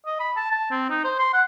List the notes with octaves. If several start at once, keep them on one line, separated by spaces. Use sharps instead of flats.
D#5
B5
A5
A5
C4
D#4
C5
C6
F#5